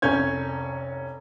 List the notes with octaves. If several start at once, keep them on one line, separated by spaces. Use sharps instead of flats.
F1 C2 C#4 C#5 G6 G#6